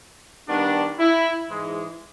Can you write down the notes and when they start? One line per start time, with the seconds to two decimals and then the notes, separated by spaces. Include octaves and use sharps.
0.48 D#3 G3 B3 D4
0.99 E4
1.49 G#2 E3 G#3